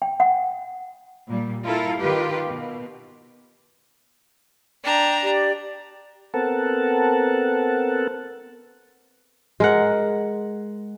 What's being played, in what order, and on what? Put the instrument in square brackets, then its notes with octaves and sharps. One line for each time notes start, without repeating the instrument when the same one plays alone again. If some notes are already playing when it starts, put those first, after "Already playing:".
[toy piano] G5
F#5
[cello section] A#2 G3
E4 F4 A4 A#4 F5
D#3 F4 G4 B4
B2
[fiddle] D4 A#5 [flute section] G5
[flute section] G4 D5
[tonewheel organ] B3 C4 A4 A#4 F#5 A5
[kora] G#3 A#4 F#5